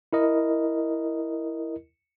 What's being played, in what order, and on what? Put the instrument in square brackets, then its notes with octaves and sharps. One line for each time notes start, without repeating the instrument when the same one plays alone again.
[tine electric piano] E4 A#4 D#5